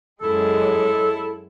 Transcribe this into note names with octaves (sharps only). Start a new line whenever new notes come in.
F#2 G#3 E4 A4